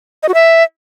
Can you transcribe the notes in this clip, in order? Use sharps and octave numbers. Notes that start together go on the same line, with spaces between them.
D#5
F#4
E5